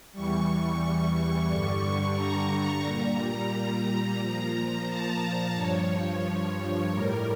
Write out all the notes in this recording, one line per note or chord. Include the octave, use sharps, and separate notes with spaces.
E2 E3 G3 C#6
G2 D3 G3
A#5
A#2 G3
A#5
A#2 F3
A5
G2 F3 C#5
A2 G3 A#4